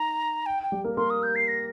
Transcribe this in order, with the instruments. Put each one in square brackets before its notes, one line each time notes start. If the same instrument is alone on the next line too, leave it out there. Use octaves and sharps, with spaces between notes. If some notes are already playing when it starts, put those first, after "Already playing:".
Already playing: [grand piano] D#4 [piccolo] A#5
[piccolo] G5
G5
[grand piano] G3 G4
A#3 A#4
[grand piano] A#3 A#4 [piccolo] C6
[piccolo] D#6
G6
C7
A#6